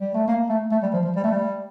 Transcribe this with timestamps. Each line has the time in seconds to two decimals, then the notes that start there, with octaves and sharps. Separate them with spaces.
0.01 G3
0.14 A3
0.28 A#3
0.49 A3
0.72 A3
0.83 G3
0.93 F3
1.05 F3
1.16 G3
1.24 A3
1.31 G3